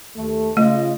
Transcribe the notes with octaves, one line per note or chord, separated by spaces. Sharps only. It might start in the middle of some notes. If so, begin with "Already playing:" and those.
D#2 A3
C#3 A3 F4 D#5